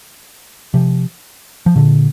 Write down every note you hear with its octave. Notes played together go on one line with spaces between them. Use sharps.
C3 F3
F3
A#2 D3